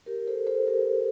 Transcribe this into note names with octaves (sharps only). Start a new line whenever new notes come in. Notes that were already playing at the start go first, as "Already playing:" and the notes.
G4 A#4
A4 C5
A4 C5
G4 A#4